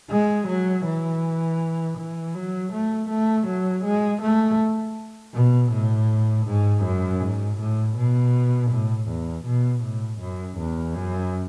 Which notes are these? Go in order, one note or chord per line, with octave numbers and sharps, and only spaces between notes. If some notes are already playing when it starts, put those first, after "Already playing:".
G#3
F#3
E3
E3
F#3
A3
A3
F#3
G#3
A3
B2
A2
G#2
F#2
G#2
A2
B2
A2
E2
B2
A2
F#2
E2
F#2